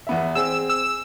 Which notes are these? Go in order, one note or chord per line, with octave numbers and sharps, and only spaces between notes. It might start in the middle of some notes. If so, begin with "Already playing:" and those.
E2 B3 E5
C4 G#4 E6
E6